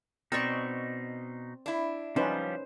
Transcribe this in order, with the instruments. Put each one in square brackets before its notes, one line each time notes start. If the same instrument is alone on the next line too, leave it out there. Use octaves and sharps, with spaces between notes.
[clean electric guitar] B2 D#4 [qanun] C4 D5 C#6
[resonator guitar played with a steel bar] D4 E4
[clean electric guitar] F3 G3 [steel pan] C#4 D#4 B4 [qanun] C5